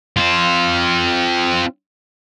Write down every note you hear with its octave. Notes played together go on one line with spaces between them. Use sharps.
C4 F4